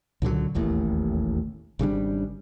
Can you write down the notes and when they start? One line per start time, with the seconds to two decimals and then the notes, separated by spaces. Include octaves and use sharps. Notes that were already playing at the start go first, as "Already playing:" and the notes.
0.22 C#2 A#2 D3 F#3
0.55 E1 A1 D#2 A2
1.79 G#1 C#3 G3 D4